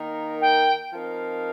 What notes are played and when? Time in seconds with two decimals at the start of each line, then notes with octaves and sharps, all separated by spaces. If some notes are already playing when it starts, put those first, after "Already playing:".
Already playing: D#3 A#3 D#4 A#4
0.41 G5
0.93 F3 C4 D#4 A#4 F5